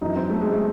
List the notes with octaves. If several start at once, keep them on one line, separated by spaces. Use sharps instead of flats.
F#2 E3 D#4
C4
A3
G#3
A3